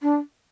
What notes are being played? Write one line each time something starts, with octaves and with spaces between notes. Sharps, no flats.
D4